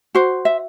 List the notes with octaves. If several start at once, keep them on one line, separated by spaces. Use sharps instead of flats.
F#4 C5
E5